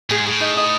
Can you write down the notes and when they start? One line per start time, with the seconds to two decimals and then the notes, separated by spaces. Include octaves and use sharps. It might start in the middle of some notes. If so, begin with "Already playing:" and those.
0.10 A2 G#4
0.20 G#2
0.26 A2 G#4
0.40 D#4
0.57 D#4